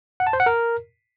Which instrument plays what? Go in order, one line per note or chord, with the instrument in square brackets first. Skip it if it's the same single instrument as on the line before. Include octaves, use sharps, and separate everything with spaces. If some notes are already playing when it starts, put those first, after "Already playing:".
[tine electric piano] F#5
A5
C5
F#5
A#4